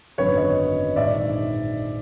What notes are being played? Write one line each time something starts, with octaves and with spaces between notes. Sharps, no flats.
G#1 F#2 D3 F#3 B3 B4 C#5
C#5 D#5
A#1 G#2 D#3 D5 E5